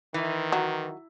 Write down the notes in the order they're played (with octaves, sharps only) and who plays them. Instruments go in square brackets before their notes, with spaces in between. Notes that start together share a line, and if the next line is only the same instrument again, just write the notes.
[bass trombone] D#3 [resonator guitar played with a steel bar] E3
[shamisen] F#3